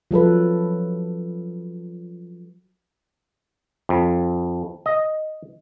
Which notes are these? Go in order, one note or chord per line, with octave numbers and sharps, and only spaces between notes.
F3 F#3 A4 B4
F2
D#5